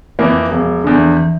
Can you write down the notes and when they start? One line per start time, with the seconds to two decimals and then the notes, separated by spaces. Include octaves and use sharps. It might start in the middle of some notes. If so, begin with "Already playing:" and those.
0.19 F2 E3 A#3
0.51 E1 F3
0.84 E2 D3
0.96 E3
1.17 E3